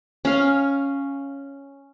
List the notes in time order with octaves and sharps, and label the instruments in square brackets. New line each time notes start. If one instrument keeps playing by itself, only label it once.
[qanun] C#4 F5